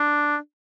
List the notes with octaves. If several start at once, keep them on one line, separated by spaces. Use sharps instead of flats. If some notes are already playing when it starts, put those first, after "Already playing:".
Already playing: D4